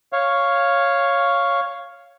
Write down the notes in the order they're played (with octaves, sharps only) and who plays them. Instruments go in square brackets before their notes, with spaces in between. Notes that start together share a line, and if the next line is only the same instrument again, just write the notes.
[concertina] C#5 F5